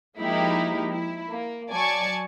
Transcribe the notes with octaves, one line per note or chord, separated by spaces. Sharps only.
F3 G#3 A#3 D#4 E4 G4
E4
A#3
F#3 D5 G#5 A5 C#6 G#6